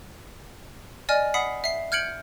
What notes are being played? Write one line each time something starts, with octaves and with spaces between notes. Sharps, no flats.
D5 D#5 G#5 F6
F#5 B5 D#6 B6 C7
E5 C7
F6 G6 G#6 C#7 D7 F#7